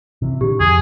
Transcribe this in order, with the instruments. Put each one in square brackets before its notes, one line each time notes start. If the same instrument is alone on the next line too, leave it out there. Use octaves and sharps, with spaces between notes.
[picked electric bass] C3 E3
[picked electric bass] A#2 D3 [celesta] G4
[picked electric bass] F2 [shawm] G#4